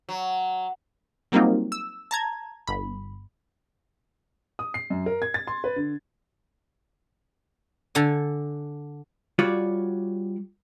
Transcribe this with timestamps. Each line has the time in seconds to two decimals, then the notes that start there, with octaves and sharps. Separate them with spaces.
0.09 F#3
1.32 F#3 G3 A#3 C4 D#4 F4
1.72 E6
2.11 A5 A#5 G#6
2.67 G1 B5
4.59 D#6
4.74 C7
4.90 F#2
5.06 A#4
5.22 G#6
5.34 A6
5.47 C6
5.64 B4
5.76 D3
7.95 D3 A4 G#5
9.39 G3 F4 F#4 C#5 D5